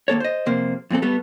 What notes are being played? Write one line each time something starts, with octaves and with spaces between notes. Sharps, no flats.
D#2 A#3 A4 C#5
C5 D#5
F2 C3 A#3 C5
F2 A#2 C4 A4
G3 A3 B3 A4